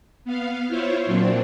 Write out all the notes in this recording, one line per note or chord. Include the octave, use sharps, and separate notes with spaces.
B3 F5
E4 F4 C5 C#5
A#2 F#3 C4 D4